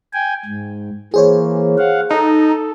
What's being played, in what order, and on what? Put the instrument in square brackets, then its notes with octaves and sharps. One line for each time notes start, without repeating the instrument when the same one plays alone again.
[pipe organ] G5 G#5
G#2
[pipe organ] E3 A#3 [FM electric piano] G#4 C5 C#5
[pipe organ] F5 F#5
[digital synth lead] D#4 [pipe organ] A4